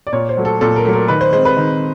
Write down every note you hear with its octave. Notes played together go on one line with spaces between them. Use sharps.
D5
A#2 C#5
C5
F#3 A3
A4
A#2 A4
A#4
F#3 A3
A#4
D#3 B4
C5
G#3 C4 C5
B4
D#3